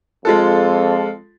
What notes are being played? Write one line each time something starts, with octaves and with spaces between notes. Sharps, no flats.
F2 G#3 F4 A4